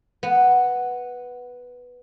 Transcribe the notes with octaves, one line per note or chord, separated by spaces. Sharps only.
B3